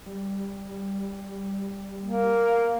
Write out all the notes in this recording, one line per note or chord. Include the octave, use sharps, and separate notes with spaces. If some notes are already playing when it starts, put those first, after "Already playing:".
G3
A#3